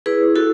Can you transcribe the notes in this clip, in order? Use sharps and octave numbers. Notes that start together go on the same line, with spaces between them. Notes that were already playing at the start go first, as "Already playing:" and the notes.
E4 G#4 B4
E4 F#4 A4